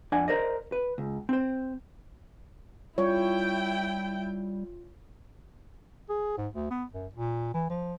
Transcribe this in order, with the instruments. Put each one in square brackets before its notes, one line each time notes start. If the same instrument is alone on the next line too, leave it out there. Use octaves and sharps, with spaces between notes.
[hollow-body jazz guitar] F2 D4 D5 F#5 G#5
A#4 C5 D5 D#5
B4
C#2
C4 C5
[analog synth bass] G3 [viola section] E4 G5 [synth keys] F4 [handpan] C#5
[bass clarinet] G#4
G#2
D2
B3
F#2
A#2
E3
F3